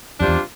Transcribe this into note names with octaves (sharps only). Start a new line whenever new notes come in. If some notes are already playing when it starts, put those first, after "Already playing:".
F2 C3 G3 D4 F4 C5
E2